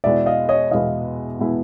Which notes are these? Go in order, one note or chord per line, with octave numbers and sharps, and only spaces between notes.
E2 B2 G#3 B3 E4 D5 E5
D#5 F5
C#5 D#5
E2 B2 G#3 B3 E4 D#5 F5
B2 G#3 B3 E4